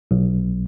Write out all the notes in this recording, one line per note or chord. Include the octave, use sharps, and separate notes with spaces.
B1